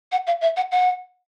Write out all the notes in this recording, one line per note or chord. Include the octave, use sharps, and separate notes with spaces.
F#5
F5
E5
F#5
F#5